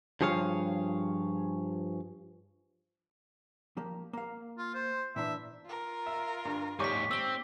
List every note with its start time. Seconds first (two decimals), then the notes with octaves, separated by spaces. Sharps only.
0.21 G2 F3 G#4 C#5 F5
3.77 F3 A#3 G4
4.13 A#3 F5
4.58 F4
4.74 C5
5.16 A#2 E3 D4 E5
5.66 F4 A#4
6.06 E5
6.45 G2
6.80 D#2 G#2 G4 C#5 D5 D6 B6
7.11 C4 E6 G7